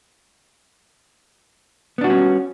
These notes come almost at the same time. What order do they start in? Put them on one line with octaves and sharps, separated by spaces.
B3 D4 F#4 G3 C#4